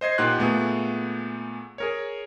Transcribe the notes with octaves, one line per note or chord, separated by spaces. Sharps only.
C5 D#5 G#6 C7
A#2 D#4 G4 F#5 C6 F#6
A#2 A3 B3 G#4
G#4 A#4 C#5